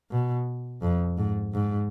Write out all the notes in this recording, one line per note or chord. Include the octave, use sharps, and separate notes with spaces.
B2
F2
G#2
G#2